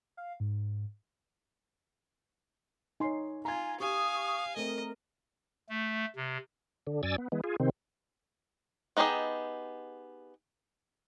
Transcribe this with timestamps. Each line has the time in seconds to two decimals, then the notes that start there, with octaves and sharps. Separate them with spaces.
0.17 F5
0.40 G#2
3.00 D#4 C#5 G#5 C6
3.45 F4 G#5 A#5 G#6
3.80 G4 F5 G#5 C#6 D#6
4.56 A3 C4 A#4 D#5
5.69 A3
6.16 C3
6.87 D3
7.03 F#2 D5 G#5 E6 A6
7.18 B3
7.32 E3 G#3 B3
7.44 F4 G#4
7.60 C3 D#3 C4
8.97 B3 D#4 G4 G#4 D#5